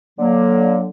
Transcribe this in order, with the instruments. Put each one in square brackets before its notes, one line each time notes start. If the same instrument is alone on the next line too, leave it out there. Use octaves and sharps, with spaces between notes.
[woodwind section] D3 F#3 A#3